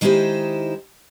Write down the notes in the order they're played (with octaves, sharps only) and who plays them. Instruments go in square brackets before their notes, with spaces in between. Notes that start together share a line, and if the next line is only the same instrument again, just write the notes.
[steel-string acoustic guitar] D#3 G#3 D#4 E4 G4 C5